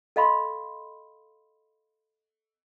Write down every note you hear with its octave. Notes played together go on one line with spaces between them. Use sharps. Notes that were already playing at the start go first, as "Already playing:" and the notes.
A4 D#5 F5 B5 C6